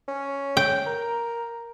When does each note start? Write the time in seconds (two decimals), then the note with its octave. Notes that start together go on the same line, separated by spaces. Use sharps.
0.08 C#4
0.57 G5
0.86 A#4